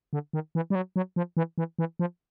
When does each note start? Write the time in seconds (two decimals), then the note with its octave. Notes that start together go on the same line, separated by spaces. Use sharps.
0.13 D3
0.33 D#3
0.55 E3
0.70 G3
0.75 F#3
0.96 F#3
1.16 F3
1.37 E3
1.58 E3
1.79 E3
1.99 F3